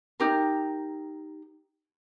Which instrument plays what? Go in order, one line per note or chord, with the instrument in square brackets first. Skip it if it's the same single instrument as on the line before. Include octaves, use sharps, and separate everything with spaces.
[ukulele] D#4 G4 A#4